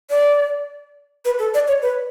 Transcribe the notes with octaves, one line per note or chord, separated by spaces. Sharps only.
D5
B4
A4
D5
C#5
B4